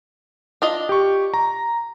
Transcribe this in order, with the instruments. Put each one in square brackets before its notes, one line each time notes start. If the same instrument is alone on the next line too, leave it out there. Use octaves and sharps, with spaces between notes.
[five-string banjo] D4 F4 D#5
[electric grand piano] G4 C#6
A#5